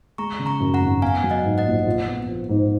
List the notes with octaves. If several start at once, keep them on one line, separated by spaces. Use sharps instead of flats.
G#3 A#5 C#6
C#3
A#5 C#6
F#2
F#5 A#5
G#1
B3 F5 G#5
F#3
D#5 F#5
G#2
D#5 F#5
A#1
F4
B3
F3
G#2